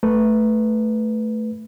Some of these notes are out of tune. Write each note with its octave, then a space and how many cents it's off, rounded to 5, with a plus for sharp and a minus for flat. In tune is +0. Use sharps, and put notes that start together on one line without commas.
A3 +0 B4 +0